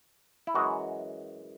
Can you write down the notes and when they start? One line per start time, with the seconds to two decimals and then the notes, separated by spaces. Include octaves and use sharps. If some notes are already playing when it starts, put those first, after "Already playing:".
0.47 E4
0.54 F#2 E3 G#3 F#4